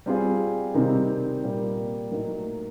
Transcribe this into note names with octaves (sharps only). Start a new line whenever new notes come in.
G3 C4 F4 G#4
C3 D#3 G3 C4 D#4
A#2 G3 A#3
A2 F#3 A#3 D#4